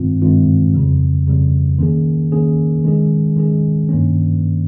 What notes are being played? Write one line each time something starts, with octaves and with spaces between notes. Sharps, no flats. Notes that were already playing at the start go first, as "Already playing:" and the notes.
Already playing: G2 D#3 G#3 C4 F4
G2 D#3 G#3 C4 F4
F2 C#3 G3
F2 C#3 G3
D#3 A#3 C#4 G#4
D#3 A#3 C#4 G#4
D#3 G#3 C#4 G#4
D#3 G#3 C#4 G#4
G2 D#3 A#3 C#4